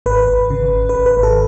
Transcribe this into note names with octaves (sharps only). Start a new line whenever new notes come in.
G#1 B4
G#1
C#3
G#1
B4
G#1
B4
G#1
A4